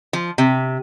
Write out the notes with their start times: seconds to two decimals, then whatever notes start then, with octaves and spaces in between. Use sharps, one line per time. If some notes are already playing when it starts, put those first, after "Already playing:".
0.13 F3
0.38 C3